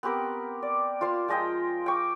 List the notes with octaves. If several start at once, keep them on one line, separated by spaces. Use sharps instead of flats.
B3 C4 G4 A#4
D5
F4 C5 F5 C6
F3 G#3 D#5 G5
G5 C#6 D6